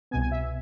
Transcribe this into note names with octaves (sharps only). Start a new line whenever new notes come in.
C2 B2 B3 G#5
G#5
E5